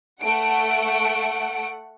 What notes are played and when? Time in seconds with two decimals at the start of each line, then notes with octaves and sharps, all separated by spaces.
0.22 A3 F#5 D7